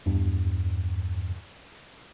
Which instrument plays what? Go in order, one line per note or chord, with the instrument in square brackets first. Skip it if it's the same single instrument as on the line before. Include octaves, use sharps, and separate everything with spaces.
[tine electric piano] E2 G2